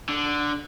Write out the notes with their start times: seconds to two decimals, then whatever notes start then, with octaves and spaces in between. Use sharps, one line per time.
0.09 D3